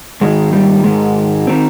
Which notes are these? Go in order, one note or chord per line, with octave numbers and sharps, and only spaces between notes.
G#2 D#3 G#3
G3
G#2 D#3 G#3
D#3 C4